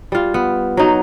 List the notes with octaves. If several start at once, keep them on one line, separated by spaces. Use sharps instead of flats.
G3 F4
B3
F#3 D#4